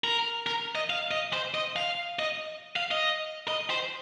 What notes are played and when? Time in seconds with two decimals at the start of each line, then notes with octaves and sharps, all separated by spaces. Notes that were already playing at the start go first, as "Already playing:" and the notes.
0.04 A#4
0.46 A#4
0.75 D#5
0.90 F5
1.11 D#5
1.33 C5
1.54 D#5
1.76 F5
2.19 D#5
2.76 F5
2.91 D#5
3.48 D#5
3.70 C5